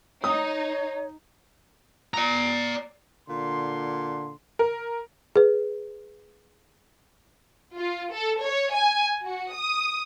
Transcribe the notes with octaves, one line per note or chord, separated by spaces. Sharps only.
D#4 C#5 D#6
D5 A#5
A#2 D3 C6
A#4
G#4 B4
F4
A4
C#5
G#5
F#4
D#6